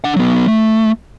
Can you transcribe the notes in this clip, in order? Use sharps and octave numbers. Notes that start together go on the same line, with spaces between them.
D4 F#5
F#3 B3
A3